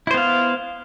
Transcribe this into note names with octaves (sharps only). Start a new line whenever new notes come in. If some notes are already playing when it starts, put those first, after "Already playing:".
B3 E4 C5 F5